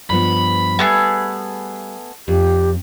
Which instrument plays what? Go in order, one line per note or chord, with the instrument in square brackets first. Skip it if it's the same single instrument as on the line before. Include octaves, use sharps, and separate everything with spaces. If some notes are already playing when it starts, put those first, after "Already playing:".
[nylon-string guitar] G2 F3 B3 [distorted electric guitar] B5
[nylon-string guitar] G3 [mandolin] A3 B3 G#4
[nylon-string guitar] F2 [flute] G4